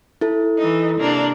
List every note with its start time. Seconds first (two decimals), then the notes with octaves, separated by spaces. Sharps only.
0.21 E4 A4
0.58 E3 D#4
1.00 C3 A#3 D4